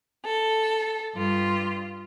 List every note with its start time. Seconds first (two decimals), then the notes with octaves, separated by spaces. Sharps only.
0.23 A4
1.15 G2 F4